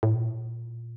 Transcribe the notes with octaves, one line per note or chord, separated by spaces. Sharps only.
A2
A#2